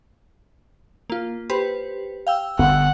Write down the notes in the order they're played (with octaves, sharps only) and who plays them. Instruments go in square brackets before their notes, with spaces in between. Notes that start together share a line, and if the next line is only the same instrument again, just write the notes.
[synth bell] A#3 F4
G4 B4 C5
F5 G5 E6
[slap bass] G1 D3 B3 [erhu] F#5